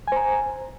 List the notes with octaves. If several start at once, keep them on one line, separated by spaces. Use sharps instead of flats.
C5 G#5 A#5